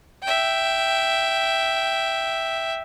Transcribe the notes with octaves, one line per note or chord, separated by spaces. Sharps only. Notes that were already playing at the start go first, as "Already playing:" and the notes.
E5 G5